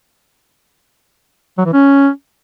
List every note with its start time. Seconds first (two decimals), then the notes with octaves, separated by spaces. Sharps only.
1.58 F#3
1.65 E3
1.73 C#4